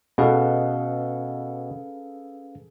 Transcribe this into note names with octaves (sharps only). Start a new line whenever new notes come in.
B2 C#4 G#4 A4 B4 F5